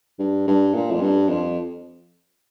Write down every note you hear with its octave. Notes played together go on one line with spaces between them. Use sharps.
G2
G2
A#2
F2
G2
F2